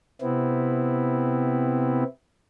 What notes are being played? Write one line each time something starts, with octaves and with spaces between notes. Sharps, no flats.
C3 B3 C4 E4